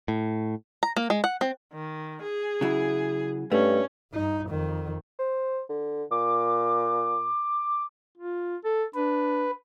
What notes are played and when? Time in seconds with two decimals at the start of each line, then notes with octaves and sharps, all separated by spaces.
0.08 A2
0.83 A#5
0.97 A#3
1.10 G#3
1.24 F#5
1.41 C4
1.74 D#3
2.23 G#4
2.61 C#3 F#3 E4
3.52 G2 A3 C#4
4.12 G2 D#4
4.49 F2 D#3
5.19 C5
5.69 D3
6.11 A#2 D6
8.18 F4
8.64 A4
8.95 D4 B4